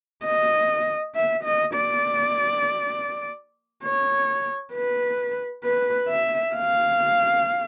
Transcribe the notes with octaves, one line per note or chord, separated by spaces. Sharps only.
D#5
E5
D#5
D5
C#5
B4
B4
E5
F5